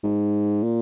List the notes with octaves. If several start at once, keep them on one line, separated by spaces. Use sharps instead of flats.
G#2
A#2